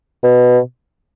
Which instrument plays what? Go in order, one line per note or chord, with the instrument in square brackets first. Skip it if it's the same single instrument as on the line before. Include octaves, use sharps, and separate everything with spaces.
[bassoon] B2